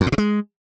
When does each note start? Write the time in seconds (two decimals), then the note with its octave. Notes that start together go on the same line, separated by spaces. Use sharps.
0.01 F2
0.07 A2
0.12 B2
0.18 G#3